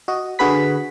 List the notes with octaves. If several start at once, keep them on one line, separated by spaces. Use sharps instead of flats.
F#4 D#5
D3 F#4 G#4 B4 B5 B6